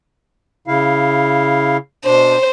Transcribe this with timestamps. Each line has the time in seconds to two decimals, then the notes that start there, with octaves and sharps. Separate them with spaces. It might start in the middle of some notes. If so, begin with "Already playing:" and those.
0.68 C#3 E4 F5
2.05 B2 D4 C5